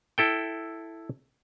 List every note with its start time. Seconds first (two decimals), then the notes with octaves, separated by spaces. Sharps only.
0.18 E4 A4 G5